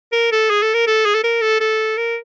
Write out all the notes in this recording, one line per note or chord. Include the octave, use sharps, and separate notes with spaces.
A#4
A4
G#4
A4
A#4
A4
G#4
A4
A#4
A4
A4
A#4